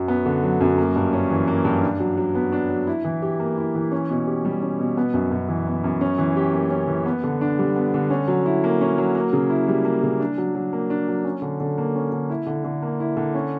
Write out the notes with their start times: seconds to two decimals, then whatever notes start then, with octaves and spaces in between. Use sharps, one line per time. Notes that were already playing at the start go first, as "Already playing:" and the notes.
Already playing: F#2 F#3
0.08 B3
0.26 D3
0.44 F#3
0.60 F#2
0.78 A#3
0.96 G2
1.13 C#4
1.31 E3
1.48 A#3
1.65 G2
1.83 D4
2.00 F#3
2.17 F#3
2.35 B3
2.52 D4
2.69 F#3
2.87 E4
3.04 E3
3.22 G4
3.40 A#3
3.58 E4
3.75 E3
3.92 C#4
4.10 B2
4.27 G4
4.45 G3
4.62 C#4
4.80 B2
4.97 B3
5.14 F#2
5.31 F#2
5.49 E3
5.67 B3
5.84 F#2
6.01 C#4
6.18 E3
6.36 G4
6.53 A#3
6.71 C#4
6.88 E3
7.06 B3
7.24 D3
7.41 D4
7.59 G3
7.76 B3
7.94 D3
8.10 C#4
8.28 F#3
8.46 E4
8.64 A#3
8.81 C#4
8.98 F#3
9.15 A#3
9.33 C#3
9.50 E4
9.68 G3
9.85 A#3
10.03 C#3
10.20 D4
10.38 F#3
10.55 F#3
10.73 A#3
10.90 D4
11.08 F#3
11.24 C#4
11.42 D3
11.60 D3
11.78 A#3
11.95 C#4
12.12 D3
12.30 E4
12.47 D3
12.64 D3
12.82 A#3
13.00 E4
13.17 D3
13.35 C#4